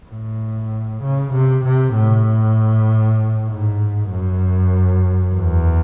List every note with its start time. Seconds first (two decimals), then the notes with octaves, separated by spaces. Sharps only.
0.09 A2
1.03 C#3
1.33 C3
1.64 C3
1.95 A2
3.49 G#2
4.11 F#2
5.35 E2